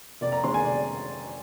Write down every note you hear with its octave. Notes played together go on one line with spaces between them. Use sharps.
F1 D5
A#5
D#2 D3 G#3 C4 C6
G#5
F1 D5